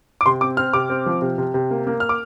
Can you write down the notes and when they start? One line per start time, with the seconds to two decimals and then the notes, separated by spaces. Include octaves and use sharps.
0.21 D6
0.26 C3 C6
0.41 C4 D6
0.57 C4 F6
0.73 C3 D6
0.90 C4
1.06 F3
1.22 C3
1.38 C3
1.54 C3
1.71 A#3
1.87 A#3
2.00 F6
2.09 D6